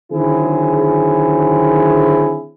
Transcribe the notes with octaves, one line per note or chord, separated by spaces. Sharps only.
D3 D#3 F#3 C4 E4 G#4